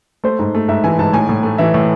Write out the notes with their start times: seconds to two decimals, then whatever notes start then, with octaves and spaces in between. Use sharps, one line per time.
0.24 A3 C5
0.39 G#2
0.55 A3
0.68 G#2 E5
0.84 E3 G#5
0.99 G#2 A5
1.13 A2 G#5
1.29 A2
1.43 A3
1.58 E3 E5
1.74 A2